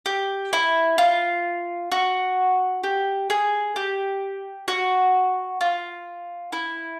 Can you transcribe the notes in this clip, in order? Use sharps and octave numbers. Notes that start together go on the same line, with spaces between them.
G4
E4
F4
F#4
G4
G#4
G4
F#4
F4
E4